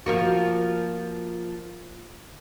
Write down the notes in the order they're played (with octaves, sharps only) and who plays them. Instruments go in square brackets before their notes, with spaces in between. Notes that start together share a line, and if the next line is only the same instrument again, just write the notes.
[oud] F3 A#3 F#4